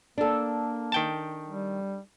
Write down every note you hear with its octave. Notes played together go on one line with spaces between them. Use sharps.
A#3 D4 A4
D#3 G5 A5
G3